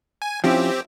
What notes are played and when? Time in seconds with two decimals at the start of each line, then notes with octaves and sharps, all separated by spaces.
0.22 G#5
0.44 F3 C4 C#4 E4 G4